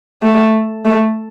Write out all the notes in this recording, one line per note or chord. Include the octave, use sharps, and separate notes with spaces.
A3
A3